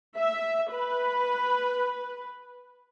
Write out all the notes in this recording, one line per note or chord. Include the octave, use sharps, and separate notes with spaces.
E5
B4